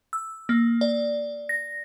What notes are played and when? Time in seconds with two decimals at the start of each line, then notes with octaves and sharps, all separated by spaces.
0.13 E6
0.49 A#3
0.81 D5
1.49 A#6